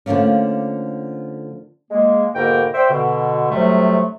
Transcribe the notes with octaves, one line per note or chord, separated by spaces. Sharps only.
D3 F3 A3 A#3 C#4
G#3 A#3
G#2 B2 D3 A#3 A#4 G5
C5 D5 E5 G5
B2 D3
D2 C3 F#3 G3 A3